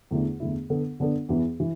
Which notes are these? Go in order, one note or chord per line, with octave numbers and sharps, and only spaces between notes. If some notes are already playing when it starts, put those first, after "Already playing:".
E2 D3 A3 E4
E2 D3 A3 E4
D3 B3 D4 A4
D3 B3 D4 A4
E2 E3 B3
E3